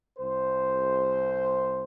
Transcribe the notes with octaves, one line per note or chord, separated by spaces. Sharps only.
C2 C5